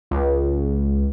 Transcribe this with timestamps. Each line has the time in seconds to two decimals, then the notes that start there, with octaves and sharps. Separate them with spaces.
0.11 C#2